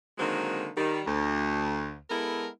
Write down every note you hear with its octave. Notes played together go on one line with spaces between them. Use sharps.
D3 D#3 F#3 G#3 A#3 C4
D#3 G3
D2
G#3 B3 E4 A4 A#4